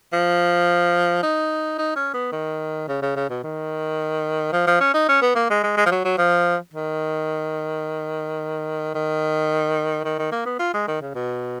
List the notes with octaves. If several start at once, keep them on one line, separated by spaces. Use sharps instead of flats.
F3
D#4
D#4
C#4
B3
D#3
C#3
C#3
C#3
B2
D#3
F3
F3
C#4
D#4
C#4
B3
A#3
G#3
G#3
G#3
F3
F#3
F#3
F3
D#3
D#3
D#3
D#3
A#3
B3
F4
G#3
D#3
C#3
B2